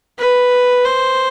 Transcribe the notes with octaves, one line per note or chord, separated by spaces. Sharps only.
B4
C5